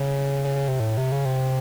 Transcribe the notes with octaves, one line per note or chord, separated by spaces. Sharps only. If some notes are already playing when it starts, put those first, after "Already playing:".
Already playing: C#3
C#3
C#3
C3
A2
C3
C#3
C3